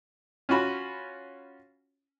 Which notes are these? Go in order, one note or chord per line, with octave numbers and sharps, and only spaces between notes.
C#4 F4 F#4 B5